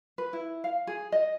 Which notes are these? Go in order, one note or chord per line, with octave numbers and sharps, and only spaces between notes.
B4
E4
F5
G#4
D#5